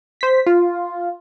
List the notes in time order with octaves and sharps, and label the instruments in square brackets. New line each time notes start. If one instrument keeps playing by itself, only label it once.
[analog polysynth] C5 B6
F4